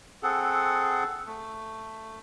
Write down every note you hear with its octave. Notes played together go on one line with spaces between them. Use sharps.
C4 G#4 A4 F#5
A3